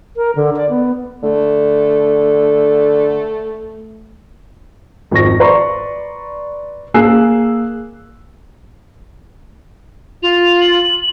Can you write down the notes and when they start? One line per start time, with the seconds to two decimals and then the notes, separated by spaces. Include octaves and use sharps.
0.17 A#4
0.36 D3
0.56 D5
0.70 B3
1.23 D3 A3
5.11 G#1 F2 C#6 A#6
5.40 B4 D5 A#5 C6 C#6
6.94 A#3 G#4 G#5 E6 F#6 C7
10.22 F4 F7
10.60 F#7